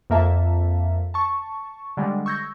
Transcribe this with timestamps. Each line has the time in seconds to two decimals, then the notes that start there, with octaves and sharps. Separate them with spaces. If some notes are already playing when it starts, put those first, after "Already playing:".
0.10 F2 A#3 E5 A5
1.14 A5 C#6
1.97 D3 G3 G#3
2.26 C#6 E6 G6 G#6 A#6